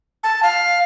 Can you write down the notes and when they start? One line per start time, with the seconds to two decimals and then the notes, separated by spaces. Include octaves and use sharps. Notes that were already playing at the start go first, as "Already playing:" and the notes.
0.23 A5
0.43 F5